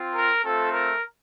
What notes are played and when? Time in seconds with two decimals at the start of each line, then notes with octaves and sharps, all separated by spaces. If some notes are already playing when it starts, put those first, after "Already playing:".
Already playing: C4 F4
0.15 A#4
0.43 A3 C4 F4 A4
0.73 A#4